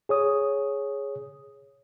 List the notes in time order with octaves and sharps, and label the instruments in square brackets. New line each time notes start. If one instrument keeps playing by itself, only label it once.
[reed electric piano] G#4 C#5 D#6